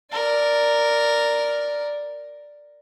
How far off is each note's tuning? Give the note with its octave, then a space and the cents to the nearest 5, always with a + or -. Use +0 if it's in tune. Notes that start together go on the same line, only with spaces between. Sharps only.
A#4 +0 D5 +0